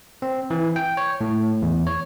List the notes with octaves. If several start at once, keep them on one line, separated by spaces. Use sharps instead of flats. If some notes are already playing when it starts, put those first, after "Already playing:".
C4
E3
G5
C#5
A2
E2
C#5